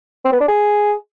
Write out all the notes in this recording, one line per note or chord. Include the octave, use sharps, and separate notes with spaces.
C4
B3
D4
G#4